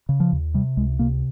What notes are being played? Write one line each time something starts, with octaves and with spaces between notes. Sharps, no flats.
C#3
F3
D#2
C3 G3
C#2 G#3
C3 A#3